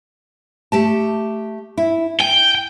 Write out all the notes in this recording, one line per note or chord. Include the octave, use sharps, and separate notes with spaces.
A3 G4 A5
E4
G5 G#5